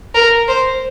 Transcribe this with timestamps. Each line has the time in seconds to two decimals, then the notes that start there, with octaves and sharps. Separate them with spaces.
0.15 A#4
0.48 C5